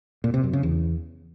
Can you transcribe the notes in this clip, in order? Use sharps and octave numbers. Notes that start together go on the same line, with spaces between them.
A#2
C3
F#2
C#3
E2